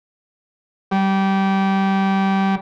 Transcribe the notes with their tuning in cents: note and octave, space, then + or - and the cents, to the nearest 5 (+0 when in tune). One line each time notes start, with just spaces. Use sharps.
G3 -20